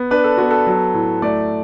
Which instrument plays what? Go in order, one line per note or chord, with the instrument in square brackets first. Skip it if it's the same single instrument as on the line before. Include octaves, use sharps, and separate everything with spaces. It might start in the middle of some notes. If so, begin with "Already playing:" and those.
Already playing: [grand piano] B3
D4 B4
A4
B3 F#4
A4
F#3
A2
A3 D5